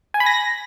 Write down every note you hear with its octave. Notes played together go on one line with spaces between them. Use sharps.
G#5
B5
A#6